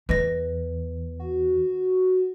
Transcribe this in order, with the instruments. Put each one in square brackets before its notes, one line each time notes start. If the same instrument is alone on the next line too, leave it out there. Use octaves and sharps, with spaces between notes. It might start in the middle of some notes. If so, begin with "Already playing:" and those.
[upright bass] E2 [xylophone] B4 D#5 A#6
[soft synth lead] F#4